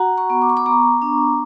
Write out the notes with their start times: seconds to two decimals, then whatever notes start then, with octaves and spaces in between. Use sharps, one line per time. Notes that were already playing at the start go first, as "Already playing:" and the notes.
Already playing: F#4 F#5 A#5
0.17 A#5 C#6
0.30 B3
0.42 D6
0.50 C#6
0.57 B5 D6
0.66 B3 A#5 C#6
1.02 D4